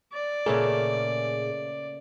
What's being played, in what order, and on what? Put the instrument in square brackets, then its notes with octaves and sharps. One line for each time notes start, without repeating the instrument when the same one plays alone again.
[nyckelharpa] D5
[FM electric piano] A#2 G#4 [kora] C#3 A3 A#3